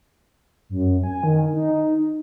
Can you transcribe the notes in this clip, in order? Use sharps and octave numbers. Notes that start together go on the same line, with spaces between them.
F#2
G#5
D#3
D#4